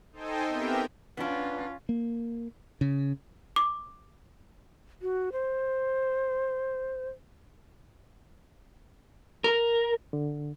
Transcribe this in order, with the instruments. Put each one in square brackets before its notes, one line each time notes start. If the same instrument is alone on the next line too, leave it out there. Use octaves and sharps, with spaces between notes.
[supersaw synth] D#4 A4 C5 D#5 G5 G#5
B3 C4 G4 A#4 E5 G5
[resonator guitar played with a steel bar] B3 D4 [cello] C#4 F4
[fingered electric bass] A#3
C#3
[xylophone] D6
[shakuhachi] F#4
C5
[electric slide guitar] A#4
[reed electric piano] D3